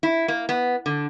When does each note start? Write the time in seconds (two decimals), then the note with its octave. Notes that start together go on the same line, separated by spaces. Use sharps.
0.03 E4
0.28 A#3
0.49 B3
0.86 D3